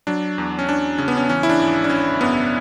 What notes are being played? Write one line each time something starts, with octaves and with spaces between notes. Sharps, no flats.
F#3 D4
E2
C#4
E2 D4
C#3 C#4
B3
C#4
E3 C#4
E4
D4
G#1
D4
G#1 C#4
F#2 B3